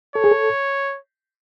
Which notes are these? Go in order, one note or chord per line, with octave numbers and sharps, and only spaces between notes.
A4 C#5
G#4
A4